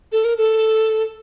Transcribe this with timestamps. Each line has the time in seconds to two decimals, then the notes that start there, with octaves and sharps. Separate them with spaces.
0.12 A4
0.24 A#4
0.38 A4